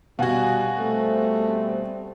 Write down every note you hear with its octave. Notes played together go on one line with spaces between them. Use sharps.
B2 G3 F#4 F5 F#5 G#5
G3 A3 C4